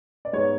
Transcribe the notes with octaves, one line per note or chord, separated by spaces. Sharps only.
D5
G#2 G#3 B3 C#5